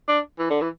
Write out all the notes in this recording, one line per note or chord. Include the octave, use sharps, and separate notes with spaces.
D4
E3
D3
E3